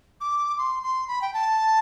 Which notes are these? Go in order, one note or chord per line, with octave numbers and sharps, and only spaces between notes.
D6
C6
C6
B5
G5
A5